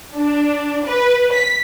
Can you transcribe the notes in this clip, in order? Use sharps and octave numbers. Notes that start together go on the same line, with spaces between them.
D4
B4
B6